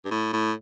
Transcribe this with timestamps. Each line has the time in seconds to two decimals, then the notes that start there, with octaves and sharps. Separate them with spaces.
0.05 G2
0.11 A2
0.33 A2